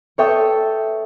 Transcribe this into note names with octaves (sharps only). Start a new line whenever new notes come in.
A4 C#5 E5 G5 C#6 D#6